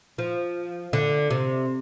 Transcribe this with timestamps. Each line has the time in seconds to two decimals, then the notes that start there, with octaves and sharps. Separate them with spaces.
0.18 F3
0.93 D3
1.30 C3